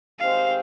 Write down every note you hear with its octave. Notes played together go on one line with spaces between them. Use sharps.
D#3 G#3 C4 G4 C5 F5